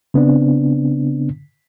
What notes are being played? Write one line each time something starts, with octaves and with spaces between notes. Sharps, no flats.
C#3 B3 C4 D4